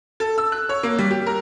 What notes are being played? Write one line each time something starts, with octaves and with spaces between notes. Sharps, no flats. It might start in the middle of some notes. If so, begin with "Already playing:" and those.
A4
E6
F#6
C#5
A#3
G3
G4
A#4